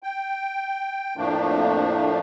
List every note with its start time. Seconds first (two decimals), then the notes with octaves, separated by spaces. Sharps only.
0.03 G5
1.17 F2 A2 F3 A3 A#3 D4